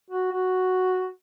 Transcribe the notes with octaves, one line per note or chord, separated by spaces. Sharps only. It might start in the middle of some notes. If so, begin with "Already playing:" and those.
F#4
F#4